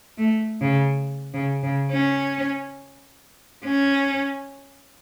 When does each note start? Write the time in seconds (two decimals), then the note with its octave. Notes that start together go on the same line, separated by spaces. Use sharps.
0.18 A3
0.61 C#3
1.34 C#3
1.63 C#3
1.91 C#4
3.65 C#4